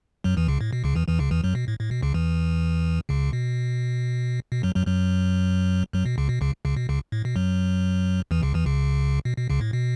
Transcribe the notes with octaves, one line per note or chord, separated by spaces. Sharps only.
F#2 F#3
E2 E3
C#2 C#3
A2
B2
C#2 C#3
E2 E3
E2 E3
C#2 C#3
E2 E3
F#2 F#3
B2
A2
A2
B2
C#2 C#3
E2 E3
C#2 C#3
B2
B2
F#2 F#3
F#2 F#3
F#2 F#3
F#2 F#3
B2
C#2 C#3
B2
C#2 C#3
C#2 C#3
B2
C#2 C#3
A2
B2
F#2 F#3
E2 E3
C#2 C#3
E2 E3
C#2 C#3
B2
B2
C#2 C#3
A2
B2